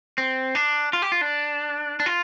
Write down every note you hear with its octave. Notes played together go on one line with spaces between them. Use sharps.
C4
D4
F4
G4
F4
D4
D4
F4